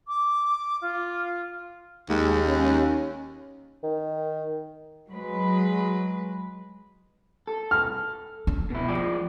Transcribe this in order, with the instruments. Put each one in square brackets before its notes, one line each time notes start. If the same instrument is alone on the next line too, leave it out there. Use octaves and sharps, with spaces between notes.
[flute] D6
F4
[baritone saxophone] D#2 [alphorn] G#3
[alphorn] C#4
[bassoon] D#3
[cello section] F#3 G#3 B4
[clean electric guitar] A4
[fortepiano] F6
[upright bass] D4
[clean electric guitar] B2 E4
F3 G#3 D5